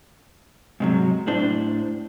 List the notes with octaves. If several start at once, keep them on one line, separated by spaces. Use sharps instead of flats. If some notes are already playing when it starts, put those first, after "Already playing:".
G#2 C3 F#3
A2 D4 C5